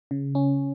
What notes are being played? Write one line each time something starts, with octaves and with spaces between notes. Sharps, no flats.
C#3
C#4